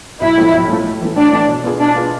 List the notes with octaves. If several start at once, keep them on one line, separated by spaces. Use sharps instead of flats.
B1 E4
A2 F3 A3
B1
A2 F3 A3
A2
E3 A3
A2 D4
E3 A3
B2
B3 F4 G#4
B2 D4
B3 F4 G#4